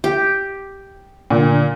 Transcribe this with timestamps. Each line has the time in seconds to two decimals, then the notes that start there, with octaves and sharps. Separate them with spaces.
0.04 G4
1.31 A#2 D3